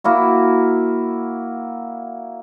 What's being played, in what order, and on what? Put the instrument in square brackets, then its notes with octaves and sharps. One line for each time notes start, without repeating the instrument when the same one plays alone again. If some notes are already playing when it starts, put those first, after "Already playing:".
[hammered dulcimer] A#3 E4 F#4